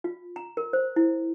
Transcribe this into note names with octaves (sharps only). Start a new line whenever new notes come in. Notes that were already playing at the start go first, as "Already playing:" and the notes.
F4
A#5
A#4
C5
E4